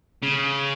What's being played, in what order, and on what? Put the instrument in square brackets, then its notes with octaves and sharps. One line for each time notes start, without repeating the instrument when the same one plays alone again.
[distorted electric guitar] C#3